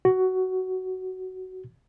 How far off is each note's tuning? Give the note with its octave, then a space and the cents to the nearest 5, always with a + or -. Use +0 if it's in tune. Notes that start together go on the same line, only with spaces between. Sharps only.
F#4 +15